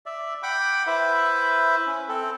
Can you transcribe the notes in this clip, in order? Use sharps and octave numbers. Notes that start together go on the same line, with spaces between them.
D5 E5
F#5 G5 B5 D6
E4 B4 C5 E5
C#4
C4 A4